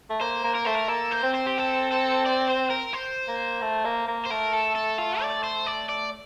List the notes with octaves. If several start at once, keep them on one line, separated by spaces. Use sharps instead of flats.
A3
A#3 C5
A#3
A#4
A3 C5
A#4
A#3 A4
C5
C4
C5
G4
A4
A4
D5
C5
A#4
C5
A#3
A3
A#3
A#3
C5
A3 A#4
A4
A4
F4
D5
C5
D5
D5